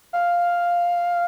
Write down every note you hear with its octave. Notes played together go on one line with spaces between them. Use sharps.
F5